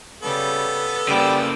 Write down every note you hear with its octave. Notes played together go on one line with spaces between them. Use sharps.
C#3 G3 B3 A4
C#3 G3 A#3 C5 D6 E6